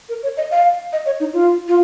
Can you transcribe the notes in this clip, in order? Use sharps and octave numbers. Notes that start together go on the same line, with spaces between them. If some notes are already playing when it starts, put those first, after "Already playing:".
A#4
C#5
D#5
F5
D#5
C#5
D#4
F4
F4